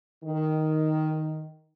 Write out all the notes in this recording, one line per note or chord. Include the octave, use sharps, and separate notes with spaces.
D#3